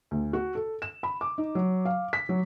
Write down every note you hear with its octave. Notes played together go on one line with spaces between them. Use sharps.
D2
F#4
A4
E7
B5
D6
D#4
F#3
F5
B6
F#3